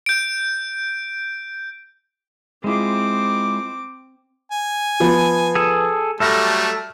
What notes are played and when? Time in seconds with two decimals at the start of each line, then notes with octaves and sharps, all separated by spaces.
0.06 G6 D7
2.64 G#3 C4 E4 F4 D6
4.52 G#5
5.00 F3 B3
5.55 G#4 A4
6.20 F#3 G3 A3 A4 E5 F6 A#6